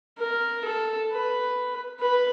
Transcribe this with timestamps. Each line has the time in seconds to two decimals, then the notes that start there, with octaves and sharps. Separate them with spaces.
0.18 A#4
0.65 A4
1.12 B4
2.00 B4